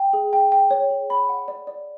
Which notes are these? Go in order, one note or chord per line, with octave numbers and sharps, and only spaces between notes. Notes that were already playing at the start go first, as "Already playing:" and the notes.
Already playing: G5
G#4
G5
G5
C#5
G#4
B5
F#5
D5
D5